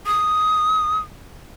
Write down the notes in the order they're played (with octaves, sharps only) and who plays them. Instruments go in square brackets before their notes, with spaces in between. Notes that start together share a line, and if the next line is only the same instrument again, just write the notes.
[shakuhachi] D#6